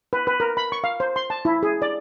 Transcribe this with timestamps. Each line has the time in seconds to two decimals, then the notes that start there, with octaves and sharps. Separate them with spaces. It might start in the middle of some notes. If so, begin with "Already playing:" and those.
0.13 B4
0.27 B4
0.40 A#4
0.57 B5
0.72 C#6
0.84 F5
1.00 C5
1.16 C6
1.30 A5
1.45 E4
1.63 G#4
1.82 D5